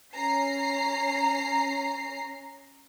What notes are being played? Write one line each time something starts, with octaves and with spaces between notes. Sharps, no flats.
C#4 A#5 C7